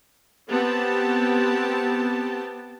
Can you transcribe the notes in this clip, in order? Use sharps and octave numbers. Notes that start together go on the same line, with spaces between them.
B3 C4 G4 A5